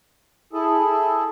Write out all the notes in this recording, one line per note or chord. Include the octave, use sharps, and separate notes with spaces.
E4 G#4 A4